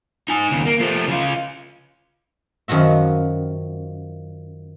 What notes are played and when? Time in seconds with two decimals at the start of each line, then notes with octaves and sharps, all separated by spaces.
0.28 D#4 G#5
0.51 D#2 C#3
0.65 A#3
0.80 F3 A3
1.08 C#3 F4
2.68 F#2 D#3 F3 F#4 E5